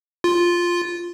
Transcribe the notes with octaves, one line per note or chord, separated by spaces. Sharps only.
F4